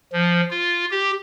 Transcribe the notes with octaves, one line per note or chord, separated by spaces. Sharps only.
F3
F4
G4